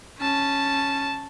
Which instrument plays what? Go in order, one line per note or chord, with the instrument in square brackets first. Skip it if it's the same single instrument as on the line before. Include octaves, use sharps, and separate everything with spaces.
[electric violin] C#4 A5